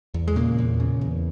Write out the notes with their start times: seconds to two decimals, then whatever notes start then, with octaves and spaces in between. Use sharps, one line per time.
0.14 E2
0.28 G#3
0.36 A#2 C#3 A#3
0.58 E2
0.80 C#3
1.01 E2